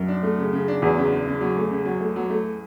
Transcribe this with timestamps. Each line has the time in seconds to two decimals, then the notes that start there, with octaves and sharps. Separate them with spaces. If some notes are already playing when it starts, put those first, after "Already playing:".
Already playing: F#2
0.08 D4
0.23 A3
0.38 C#3
0.53 C#3
0.68 D4
0.82 E2 F#3
0.98 C#3
1.12 D4
1.27 C#3
1.41 F#3
1.56 A3
1.71 C#3
1.85 F#3
2.00 A3
2.16 F#3
2.30 A3